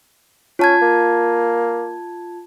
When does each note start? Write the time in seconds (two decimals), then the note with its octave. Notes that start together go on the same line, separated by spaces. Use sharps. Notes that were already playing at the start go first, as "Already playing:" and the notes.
0.59 C#4 F4 A5 G#6
0.82 A#3